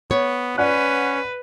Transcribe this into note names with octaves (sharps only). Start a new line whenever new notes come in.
B3 C#5
C#4 B4 D5 F#5 F#6